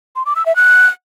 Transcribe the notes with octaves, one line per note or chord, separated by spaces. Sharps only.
C6
D6
E6
E5
F#6